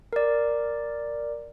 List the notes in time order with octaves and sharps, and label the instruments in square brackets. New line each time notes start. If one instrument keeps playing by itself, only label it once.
[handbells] A#4 D5